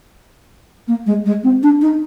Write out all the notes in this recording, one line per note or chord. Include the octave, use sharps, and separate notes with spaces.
A#3
G#3
G#3
C4
D4
D#4